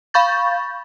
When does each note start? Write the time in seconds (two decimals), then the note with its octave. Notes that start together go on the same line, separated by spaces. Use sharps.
0.14 F5 B5 C#6 G6 A6